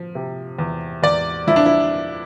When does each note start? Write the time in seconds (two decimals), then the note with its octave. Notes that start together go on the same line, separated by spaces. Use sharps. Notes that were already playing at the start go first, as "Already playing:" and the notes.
Already playing: F3
0.15 C3
0.59 E2
1.03 E2 D5
1.47 F3 E4
1.56 D4
1.66 E4